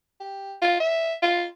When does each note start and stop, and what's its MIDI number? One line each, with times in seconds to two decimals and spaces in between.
0.20 0.54 67
0.62 0.76 65
0.80 1.14 76
1.22 1.45 65